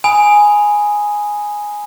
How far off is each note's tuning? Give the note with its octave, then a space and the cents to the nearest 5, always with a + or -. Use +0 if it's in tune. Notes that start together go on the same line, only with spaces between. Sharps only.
G#5 +0 B5 +0 D#6 +0